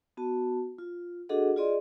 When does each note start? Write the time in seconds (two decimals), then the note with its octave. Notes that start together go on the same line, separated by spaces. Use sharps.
0.17 B3 F#4 A5
0.78 F4
1.29 D4 F#4 G#4 A4 D#5 F#5
1.56 F4 G#4 D5 D#5 C6